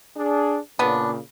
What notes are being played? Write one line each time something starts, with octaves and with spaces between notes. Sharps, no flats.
D4 G#4
A#2 C#3 B3 D4